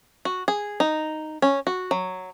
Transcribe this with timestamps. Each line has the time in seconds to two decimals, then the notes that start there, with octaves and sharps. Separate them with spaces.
0.25 F#4
0.48 G#4
0.80 D#4
1.42 C#4
1.67 F#4
1.91 F#3